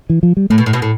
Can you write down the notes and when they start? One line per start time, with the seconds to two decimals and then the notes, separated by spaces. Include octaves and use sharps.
0.10 E3
0.23 F3
0.37 G3
0.50 A2 A3
0.58 B2
0.66 A2
0.73 B2
0.82 A2